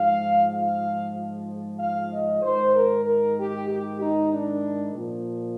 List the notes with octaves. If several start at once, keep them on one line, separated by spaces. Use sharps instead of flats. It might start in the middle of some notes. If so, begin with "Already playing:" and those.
Already playing: G#2 F3 F5
F5
F5
D#5
G#2 D#3 C5
A#4
A#4
G4
G4
D#4
D4
A#2 F3